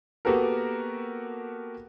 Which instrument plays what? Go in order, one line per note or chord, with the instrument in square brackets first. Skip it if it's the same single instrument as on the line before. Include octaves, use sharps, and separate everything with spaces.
[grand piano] A#3 B3 F#4 G4 A4 A#4